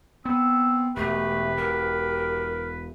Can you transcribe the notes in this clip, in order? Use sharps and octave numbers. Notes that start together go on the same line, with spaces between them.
B3 C4 E6
E1 A3 G4 B4
E1 A#4